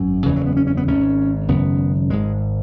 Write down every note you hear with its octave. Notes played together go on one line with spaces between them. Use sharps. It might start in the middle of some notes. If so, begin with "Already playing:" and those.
Already playing: G#1 F#2
F#1 E2 C#3 E3
F#3
B3
C#4
C#4
B3
G#1 G#2 C#4
G#1 F#2 C#3 B3
G#1 G#2 G#3